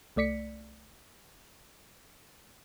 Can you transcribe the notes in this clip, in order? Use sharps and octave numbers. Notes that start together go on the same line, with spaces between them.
C2 A3 D5 B6 C#7